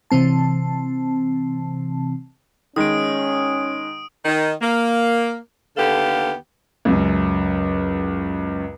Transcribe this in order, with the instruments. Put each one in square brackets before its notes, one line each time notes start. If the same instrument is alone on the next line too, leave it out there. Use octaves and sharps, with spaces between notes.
[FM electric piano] C3 E3 C4 A5
[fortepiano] D#3 G#3 [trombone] C#4 [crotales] D#6 D7
[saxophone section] D#3 D#4
A#3
D#2 D3 B3 G4 A4 F5
[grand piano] C#2 F#2